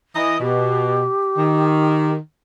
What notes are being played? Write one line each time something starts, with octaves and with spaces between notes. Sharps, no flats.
E3 D#5
B2 G4
D#3